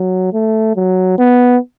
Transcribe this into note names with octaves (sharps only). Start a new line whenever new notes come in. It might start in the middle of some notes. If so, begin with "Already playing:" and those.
Already playing: F#3
A3
F#3
B3